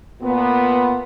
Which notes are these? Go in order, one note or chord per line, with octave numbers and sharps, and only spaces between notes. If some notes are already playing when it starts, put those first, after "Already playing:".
A#2 B3